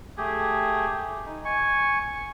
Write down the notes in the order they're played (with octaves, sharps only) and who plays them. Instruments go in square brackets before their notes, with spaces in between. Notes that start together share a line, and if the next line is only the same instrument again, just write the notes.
[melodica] A3 G4 G#4
D#4
G#5 C#6